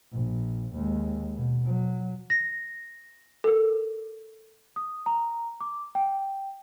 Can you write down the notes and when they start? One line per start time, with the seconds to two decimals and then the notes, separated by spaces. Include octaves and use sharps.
0.12 A#1
0.74 D#2 G#3
1.36 B2
1.66 F#3
2.30 A#6
3.44 A4 A#4
4.76 D#6
5.06 A#5
5.61 D6
5.95 G5